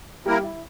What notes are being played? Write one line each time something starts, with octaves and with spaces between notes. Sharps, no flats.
G3 A#3 E4 G4 A#4
E4